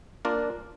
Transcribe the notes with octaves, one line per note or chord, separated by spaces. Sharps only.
A#3 D4 F4 A#4 D5